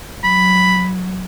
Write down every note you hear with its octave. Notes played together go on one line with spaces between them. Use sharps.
F#3 B5